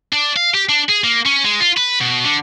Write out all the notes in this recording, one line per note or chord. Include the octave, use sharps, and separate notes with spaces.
D4
F5
G4
D4
G#4
A#3
C#4
G#3
F4
B4
B2
D3